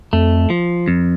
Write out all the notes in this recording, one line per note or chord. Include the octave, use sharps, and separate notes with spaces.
F2 A3
F3
F2